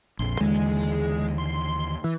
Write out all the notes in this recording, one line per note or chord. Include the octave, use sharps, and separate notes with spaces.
A#1 F2 C6
D#2 D3 E3 G#3
C6
E3